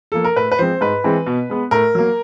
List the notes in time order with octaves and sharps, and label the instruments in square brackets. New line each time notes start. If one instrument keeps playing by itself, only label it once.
[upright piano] F3 A#3 A4
A#4
A2 B4
B4
F3 G#3 C4 C5
G#2 B4
E3 G#3 C4
B2
G#3 B3
A2 A#4
F#3 A#3